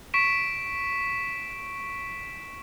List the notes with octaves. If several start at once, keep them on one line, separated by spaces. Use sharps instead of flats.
C#6 B6 D7 E7